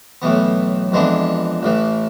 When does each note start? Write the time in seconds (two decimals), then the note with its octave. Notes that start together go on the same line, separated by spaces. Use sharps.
0.22 B1 A2 E3 B3
0.92 F2 E3 G#3 B3 D4
1.63 A1 A2 E3